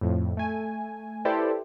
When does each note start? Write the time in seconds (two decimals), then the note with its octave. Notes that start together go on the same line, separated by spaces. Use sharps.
0.01 F2 A2
0.37 A3 G#5
1.25 E4 G4 A4 B4 C5 D5